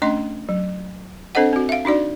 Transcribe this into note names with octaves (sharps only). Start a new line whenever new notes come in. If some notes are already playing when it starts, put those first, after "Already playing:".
A3 C#4 D4 D#5 C6
F#3
C4 D4 A4 C5 D#5 F#5
C4 F#4
E5 F5
D4 D#4 F#4 D5